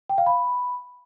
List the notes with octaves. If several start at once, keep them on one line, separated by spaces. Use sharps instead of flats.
G5
F5
B5